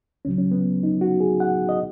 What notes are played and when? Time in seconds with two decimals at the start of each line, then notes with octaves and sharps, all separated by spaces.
0.25 C#2 C#3 F#3 C#4
0.38 C#4
0.51 B3
0.83 D#4
1.01 F#4
1.20 G#4
1.40 F#5
1.69 D#5